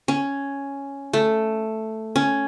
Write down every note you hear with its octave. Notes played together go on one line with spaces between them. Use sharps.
C#4
A3
C#4